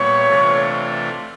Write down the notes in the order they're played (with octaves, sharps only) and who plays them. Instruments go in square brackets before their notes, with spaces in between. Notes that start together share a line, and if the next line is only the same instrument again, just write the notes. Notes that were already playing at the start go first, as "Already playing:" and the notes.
Already playing: [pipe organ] A#2 G3 B3 E4 [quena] C#5
[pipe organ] C3 E3 A3 D4 F4